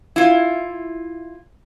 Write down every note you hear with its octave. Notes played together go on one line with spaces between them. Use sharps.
E4 F4